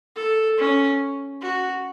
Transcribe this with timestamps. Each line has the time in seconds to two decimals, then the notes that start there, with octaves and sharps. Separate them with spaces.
0.16 A4
0.58 C#4
1.41 F#4